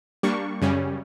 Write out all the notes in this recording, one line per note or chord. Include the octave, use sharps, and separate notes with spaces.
G3 A#3 D4 C#6
F#2 C#3 G3 C#4